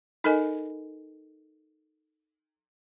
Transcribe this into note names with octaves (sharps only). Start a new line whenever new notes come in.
D#4 A4 A#4 D#5 G#5